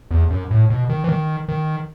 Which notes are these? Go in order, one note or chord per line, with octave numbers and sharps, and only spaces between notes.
E2
F#2
A2
B2
D#3
E3
D#3
D#3